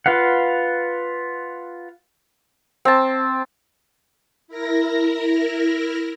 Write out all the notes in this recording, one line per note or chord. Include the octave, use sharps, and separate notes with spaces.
F4 B4 F5 F#5
C4 A5
E4 A#4 A#6